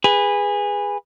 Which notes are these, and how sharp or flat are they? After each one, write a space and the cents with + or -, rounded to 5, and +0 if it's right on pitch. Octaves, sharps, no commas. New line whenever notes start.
G#4 -20 B4 +0